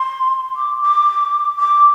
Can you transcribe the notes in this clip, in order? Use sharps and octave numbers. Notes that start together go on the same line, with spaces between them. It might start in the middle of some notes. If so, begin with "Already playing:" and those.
Already playing: C6
D6
D6
D6